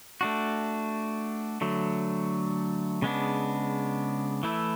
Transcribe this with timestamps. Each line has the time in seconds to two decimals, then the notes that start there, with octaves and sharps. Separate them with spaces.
0.21 A3 D4 F#4
1.61 D3 F#3 A3
3.02 C#3 G#3 B3 D4
4.43 E3 A3 E4